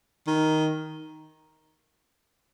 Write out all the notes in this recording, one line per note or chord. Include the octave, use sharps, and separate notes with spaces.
D#3